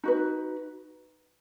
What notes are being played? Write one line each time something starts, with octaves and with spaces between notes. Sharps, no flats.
D#4 F#4 B4